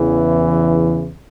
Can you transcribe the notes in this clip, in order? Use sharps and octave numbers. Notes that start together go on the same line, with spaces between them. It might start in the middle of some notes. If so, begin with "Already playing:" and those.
Already playing: E2 C#3 E3